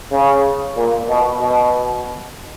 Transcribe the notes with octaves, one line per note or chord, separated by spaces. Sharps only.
C#3
A#2
B2
B2